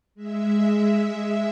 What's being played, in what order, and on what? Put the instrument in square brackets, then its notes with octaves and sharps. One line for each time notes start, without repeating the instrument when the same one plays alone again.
[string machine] G#3 E5